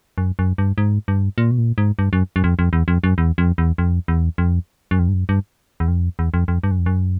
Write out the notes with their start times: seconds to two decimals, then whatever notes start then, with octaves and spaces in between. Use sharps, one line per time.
0.18 F#2
0.39 F#2
0.58 G2
0.78 G#2
1.08 G2
1.38 A#2
1.51 B2
1.58 A#2
1.78 G#2
1.99 G2
2.13 F#2
2.36 F#2
2.44 F2
2.59 F2
2.73 E2
2.88 F2
3.04 F#2
3.18 E2
3.38 F2
3.58 E2
3.78 F2
4.08 E2
4.38 F2
4.91 F#2
4.99 F2
5.08 G2
5.14 F#2
5.29 G2
5.80 E2
5.88 F2
6.19 E2
6.34 F2
6.48 F2
6.63 G2
6.71 F#2
6.79 F2
6.86 F#2